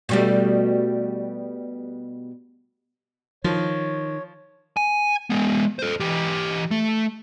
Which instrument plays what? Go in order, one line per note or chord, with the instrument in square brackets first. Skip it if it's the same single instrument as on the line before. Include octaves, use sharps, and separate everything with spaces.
[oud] B2 G3 A3
[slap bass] D#3 [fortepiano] F3 [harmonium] C#5
[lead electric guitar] G#5
G#3 B3
A4 C5
E3 G4
A3